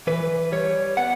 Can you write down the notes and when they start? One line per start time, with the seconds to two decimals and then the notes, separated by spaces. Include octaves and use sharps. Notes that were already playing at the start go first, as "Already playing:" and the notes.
0.07 E3 B4
0.52 G3 C#5
0.97 B3 F#5